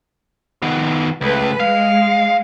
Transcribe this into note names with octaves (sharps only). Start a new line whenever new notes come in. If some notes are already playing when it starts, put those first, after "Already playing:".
D#3 B3
C#2 A3 B4
G#3 F5